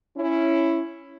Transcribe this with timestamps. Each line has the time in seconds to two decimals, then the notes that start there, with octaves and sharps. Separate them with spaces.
0.17 C#4 E4